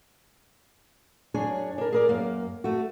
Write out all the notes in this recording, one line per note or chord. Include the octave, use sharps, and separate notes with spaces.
F#2 D4 G#4 C#5 G#5
D4 A#4
G#4 A#4 D5
F#2 A#3
A3 F#4